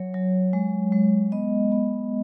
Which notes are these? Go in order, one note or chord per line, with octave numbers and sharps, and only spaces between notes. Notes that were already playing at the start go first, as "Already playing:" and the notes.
Already playing: F#3 C#5
F#3
G#3
G#3
B3 D#5
B3